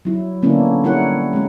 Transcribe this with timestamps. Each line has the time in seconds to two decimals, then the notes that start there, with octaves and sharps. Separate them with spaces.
0.05 F#3 E4
0.42 D3 A#3 B3 C#4 D4 E4
0.84 G3 E4 A#4 C#5 F#5
1.33 G#3 C#4